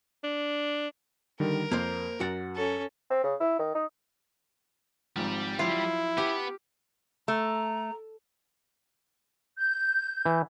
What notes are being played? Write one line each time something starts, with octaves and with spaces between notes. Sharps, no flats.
D4
D3 D#3 G3 A#4
F2 A#3 C5
F#2 F#4 F#5 A6
C#4 A4
C4
C#3
E4
D#3
D#4
G#1 G#2 F3 G3 G4
F3 F#3 E4 F4
B3 G4 A5
A3 A#5
G6
E3